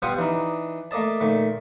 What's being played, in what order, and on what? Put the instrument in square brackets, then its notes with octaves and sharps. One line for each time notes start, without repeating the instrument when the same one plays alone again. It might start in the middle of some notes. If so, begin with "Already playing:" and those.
[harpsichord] B2 G3 F4 F#5 G5 D#6
E3 D4 D#4
A3 A#3 D5 D#5 A5
A#2 D#3 A3